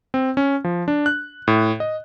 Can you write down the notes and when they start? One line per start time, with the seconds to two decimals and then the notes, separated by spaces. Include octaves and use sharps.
0.14 C4
0.37 C#4
0.64 F3
0.88 D4
1.06 F#6
1.48 A2
1.80 D#5